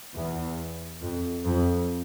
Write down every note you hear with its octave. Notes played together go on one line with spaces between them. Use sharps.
E2
F2
F2